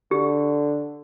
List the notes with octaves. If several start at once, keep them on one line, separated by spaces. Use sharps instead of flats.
D3 G4